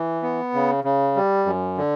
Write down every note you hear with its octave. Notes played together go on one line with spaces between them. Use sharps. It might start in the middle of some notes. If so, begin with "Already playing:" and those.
Already playing: E3
B3
C#3
C#3
G3
F#2
D3